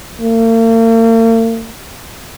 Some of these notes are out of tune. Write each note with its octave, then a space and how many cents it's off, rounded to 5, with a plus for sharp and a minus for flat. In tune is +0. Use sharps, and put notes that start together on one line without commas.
A#3 -45